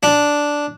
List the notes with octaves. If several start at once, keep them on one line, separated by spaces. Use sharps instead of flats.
D4